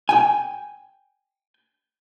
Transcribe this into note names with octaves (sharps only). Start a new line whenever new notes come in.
G5 G#5